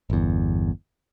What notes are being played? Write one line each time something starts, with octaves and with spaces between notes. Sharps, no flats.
G1 E2